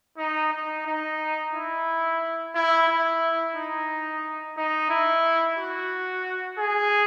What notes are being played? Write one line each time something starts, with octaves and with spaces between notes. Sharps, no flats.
D#4
D#4
D#4
E4
E4
E4
D#4
D#4
E4
F#4
G#4